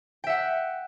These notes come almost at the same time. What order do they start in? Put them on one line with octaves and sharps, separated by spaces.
G5 E5 F#5